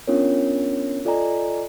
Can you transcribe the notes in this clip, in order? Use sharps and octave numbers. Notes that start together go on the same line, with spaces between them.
B3 C#4 D4 F4 A#4 C#5
F4 A4 D5 D#5 G#5 A#5